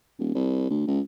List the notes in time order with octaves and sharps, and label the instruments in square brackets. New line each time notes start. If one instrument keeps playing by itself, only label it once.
[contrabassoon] D#1
C2
D2
C#2